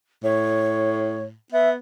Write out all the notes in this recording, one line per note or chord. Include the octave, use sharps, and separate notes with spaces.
A2 C#5
B3 E5